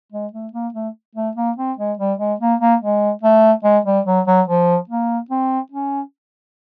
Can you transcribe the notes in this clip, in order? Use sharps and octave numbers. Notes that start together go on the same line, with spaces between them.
G#3
A3
A#3
A3
A3
A#3
C4
G#3
G3
G#3
A#3
A#3
G#3
A3
G#3
G3
F#3
F#3
F3
A#3
C4
C#4